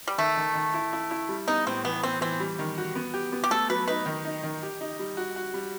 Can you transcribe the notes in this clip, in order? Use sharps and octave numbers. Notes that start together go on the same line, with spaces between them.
G3
D#3 A3
D#3
D#3
E4
E4
E4
G3
B3 D#4
A2 C4
E3 B3
B3 C4
E3 C4
G3
D#3
F#4
B3
G4
B3
G4
A3 A4
F#3 B4
D#4 B4
D#3
D#4
D#3
G4
D#4
G3
F#4
F#4
G3